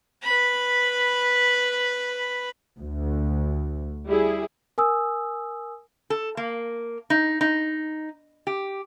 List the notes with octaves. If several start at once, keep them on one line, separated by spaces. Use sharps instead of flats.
B4 B5
D2
G3 E4 G#4
A#4 G#5 D#6 E6
A4
A#3
D#4
D#4
G4